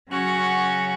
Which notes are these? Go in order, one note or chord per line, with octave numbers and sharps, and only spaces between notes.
C#3 F#3 C#4 F#4